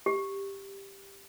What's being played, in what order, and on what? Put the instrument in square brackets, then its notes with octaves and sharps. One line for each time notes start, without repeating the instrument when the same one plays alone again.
[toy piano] G4